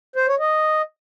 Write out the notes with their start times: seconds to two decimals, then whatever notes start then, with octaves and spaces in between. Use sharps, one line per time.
0.16 C5
0.28 C#5
0.39 D#5